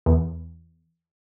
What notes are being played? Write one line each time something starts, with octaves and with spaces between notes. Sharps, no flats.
E2